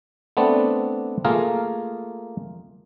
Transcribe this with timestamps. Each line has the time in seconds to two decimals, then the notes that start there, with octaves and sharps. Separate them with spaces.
0.37 A3 B3 C4 D4 D5
1.25 A3 A#3 F4 G#4 A#4